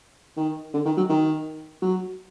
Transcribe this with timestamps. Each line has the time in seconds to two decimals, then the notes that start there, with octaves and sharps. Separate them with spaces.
0.37 D#3
0.74 D3
0.86 D#3
0.97 F#3
1.09 D#3
1.82 F#3